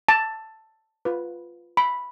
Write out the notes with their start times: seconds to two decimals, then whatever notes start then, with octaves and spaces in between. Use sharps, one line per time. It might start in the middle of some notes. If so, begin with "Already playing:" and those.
0.09 A5
1.05 F4 B4
1.77 B5